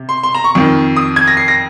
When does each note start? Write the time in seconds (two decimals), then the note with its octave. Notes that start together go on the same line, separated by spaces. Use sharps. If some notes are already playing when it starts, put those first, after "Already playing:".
Already playing: C3
0.09 C6
0.23 C6
0.35 A#5
0.44 C#6
0.55 F2 D#3
0.96 D#6
1.16 G#6
1.27 A#6
1.37 C7
1.48 A#6